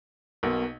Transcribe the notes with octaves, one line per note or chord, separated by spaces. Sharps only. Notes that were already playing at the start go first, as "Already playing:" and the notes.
B1 B2 A#3